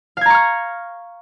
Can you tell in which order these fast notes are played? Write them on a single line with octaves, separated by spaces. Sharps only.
F5 G#6 A#5 C#6 F6